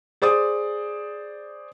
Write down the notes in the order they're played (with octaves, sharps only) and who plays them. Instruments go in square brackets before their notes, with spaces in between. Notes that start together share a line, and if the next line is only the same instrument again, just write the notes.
[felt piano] G#4 C5 D5 D#6